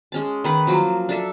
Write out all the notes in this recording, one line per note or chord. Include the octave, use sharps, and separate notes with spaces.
G#3 C#4 A5
D#3 B4 F#5
F3 F#3 A#3
D4 A4 E5